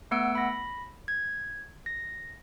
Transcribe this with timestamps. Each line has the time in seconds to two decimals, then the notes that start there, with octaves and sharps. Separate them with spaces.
0.11 A3 B3 F#5 E6 D7
0.35 B5 A#6
1.08 G#6
1.86 A#6